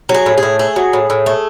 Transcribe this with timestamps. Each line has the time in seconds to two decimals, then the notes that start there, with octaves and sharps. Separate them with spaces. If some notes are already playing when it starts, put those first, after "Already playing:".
0.09 F#3
0.14 G#4
0.26 A2
0.38 G#4
0.43 A2
0.59 A3 G#4
0.76 F#3
0.93 A2
1.10 A2
1.26 A3